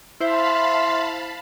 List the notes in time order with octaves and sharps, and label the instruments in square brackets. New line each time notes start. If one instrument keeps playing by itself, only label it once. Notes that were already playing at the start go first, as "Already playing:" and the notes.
[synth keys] E4 C5 [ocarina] E5 [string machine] F5 A5 B5 [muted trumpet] C6